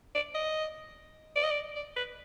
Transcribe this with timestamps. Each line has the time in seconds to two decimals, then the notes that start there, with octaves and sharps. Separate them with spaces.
0.15 D5
0.35 D#5
1.36 D5
1.44 D#5
1.51 D5
1.76 D5
1.96 B4